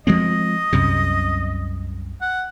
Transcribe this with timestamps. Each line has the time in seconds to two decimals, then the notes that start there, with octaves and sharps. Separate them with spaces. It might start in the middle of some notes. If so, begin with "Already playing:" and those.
0.07 F3 G#3 C4 D#5
0.73 C2 F#2 C3
2.22 F#5